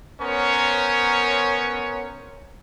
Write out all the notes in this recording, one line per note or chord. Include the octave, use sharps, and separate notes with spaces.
B3 C#4 A#4 C5 C#5